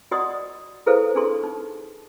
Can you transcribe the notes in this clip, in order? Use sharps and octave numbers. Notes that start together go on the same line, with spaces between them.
F#4 D5 D#5 F#5 C6 D#6
E4 G#4 A4 B4 C5 F5
D4 G#4 A4 C6
D#4